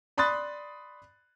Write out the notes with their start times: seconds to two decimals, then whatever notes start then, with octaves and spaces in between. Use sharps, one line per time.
0.17 D5 B5 C6 D#6 F#6 A6